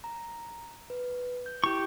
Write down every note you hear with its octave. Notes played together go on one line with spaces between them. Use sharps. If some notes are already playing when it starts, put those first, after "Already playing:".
A#5
B4
G6
E4 G4 C#6